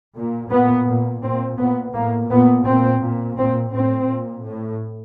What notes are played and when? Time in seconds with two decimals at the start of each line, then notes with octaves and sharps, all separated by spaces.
0.15 A#2
0.50 A#2 B3
0.87 A#2
1.22 A#2 C4
1.58 A#2 B3
1.94 A2 A#3
2.29 A#2 B3
2.65 A#2 C4
3.01 A#2
3.37 A#2 C4
3.72 A2 C4
4.07 A#2
4.44 A2